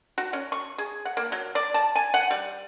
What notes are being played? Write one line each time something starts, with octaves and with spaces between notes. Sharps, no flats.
F#4
C#4
C#6
G#4
F#5
A#3
F#3
D5
A5
G#5
F#5
G3